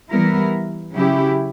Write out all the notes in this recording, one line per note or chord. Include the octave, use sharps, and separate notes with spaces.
E3 G3 B3 E4 A#4
C#3 F#3 C#4 E4 G4